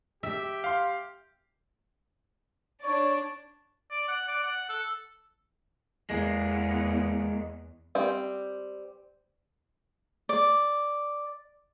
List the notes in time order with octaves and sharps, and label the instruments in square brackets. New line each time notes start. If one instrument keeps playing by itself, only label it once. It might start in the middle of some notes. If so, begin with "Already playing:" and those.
[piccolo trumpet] G4 [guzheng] E5
[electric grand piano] F5 C6
[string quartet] D4 D5 [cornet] C#5
[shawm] D5
F#5
D5
F#5
A4
[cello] E2 [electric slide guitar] G#3 A#3
[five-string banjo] G3 C4 G5
[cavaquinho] D5